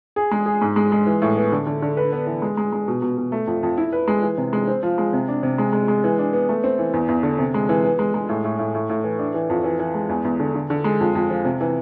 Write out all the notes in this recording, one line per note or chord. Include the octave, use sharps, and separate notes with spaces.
G#4
G#3
G#4
G#2
G#3
G#3
E3
A2
B3
D3
D3
D3
B4
B3
E3
G#3
G#3
G#3
B2
B2
B2
A3
F2
F2
E4
B4
G#3
E3
C3
G#3
C4
F3
G#3
C3
D4
C3
G#3
G#3
G#3
E3
D4
B3
A3
C4
E3
E2
E2
D3
C3
G#3
E3
B3
G#3
G#3
A2
A2
A2
A2
A2
E3
D4
E3
F2
E3
E3
G#3
E2
E2
D3
D3
D3
G#3
F2
F2
F3
C3
E3